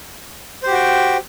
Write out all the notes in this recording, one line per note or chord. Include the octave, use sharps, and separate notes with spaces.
F#4 G4 C5 G5